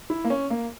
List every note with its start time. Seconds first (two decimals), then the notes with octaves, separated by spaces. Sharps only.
0.10 E4
0.25 A#3
0.30 C#4
0.50 A#3